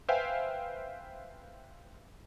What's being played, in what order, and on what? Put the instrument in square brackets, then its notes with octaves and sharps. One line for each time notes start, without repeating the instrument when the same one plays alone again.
[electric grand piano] B4 C5 E5 F5 G5 G#5